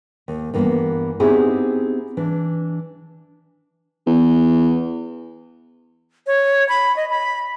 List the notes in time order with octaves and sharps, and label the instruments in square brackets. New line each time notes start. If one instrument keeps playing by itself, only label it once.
[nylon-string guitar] D#2
G2 E3 A#3 B3
B3 C4 D#4 E4 G4 G#4
E3 D4
[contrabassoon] E2
[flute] C#5
B5
D#5
B5